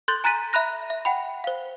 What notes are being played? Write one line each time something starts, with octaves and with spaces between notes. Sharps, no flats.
A4 C6 F#6 G6 A6 G7
G#5 A#5 F#6 A6 B6 D#7
E5 A#5 B5 F#6 A#6
E5
F#5 G5 B5
C5 F5